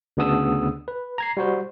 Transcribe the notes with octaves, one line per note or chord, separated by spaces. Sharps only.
D2 C#3 B3 D4 D#6 E6
B4
A#5 G#6 C7
G3 F#4 C5